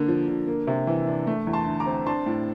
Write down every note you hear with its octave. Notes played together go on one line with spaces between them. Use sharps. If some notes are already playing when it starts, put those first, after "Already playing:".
Already playing: D3 A#3
F3
D3
A#3
C3
E3
D4
A3
E2
A5 C6
D3
A#5 D6
C4
D4 A5 C6
A2